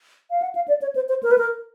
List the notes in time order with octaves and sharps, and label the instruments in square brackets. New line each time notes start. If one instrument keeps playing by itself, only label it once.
[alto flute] F5
F#5
F5
D5
C#5
C5
C5
A#4
B4
A#4